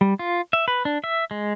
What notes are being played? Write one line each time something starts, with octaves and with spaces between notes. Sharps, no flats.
G3
F4
E5
B4
D4
E5
G#3